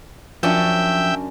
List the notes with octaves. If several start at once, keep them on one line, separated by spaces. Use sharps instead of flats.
F#2 F3 C#4 D4 E5 G5